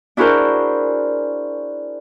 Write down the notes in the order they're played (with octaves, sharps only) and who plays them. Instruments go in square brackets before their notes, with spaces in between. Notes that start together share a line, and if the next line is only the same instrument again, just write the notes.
[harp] D4 E4 F#4 G#4 A#4 C5